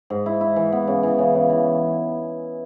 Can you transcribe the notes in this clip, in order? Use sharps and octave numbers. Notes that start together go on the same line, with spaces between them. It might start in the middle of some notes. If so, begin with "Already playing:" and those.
G#2
E4
E4
E3
B3
C#3
E3
C#3
C#3
E3